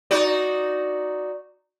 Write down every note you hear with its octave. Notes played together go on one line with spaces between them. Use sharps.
D#4 F#4 D5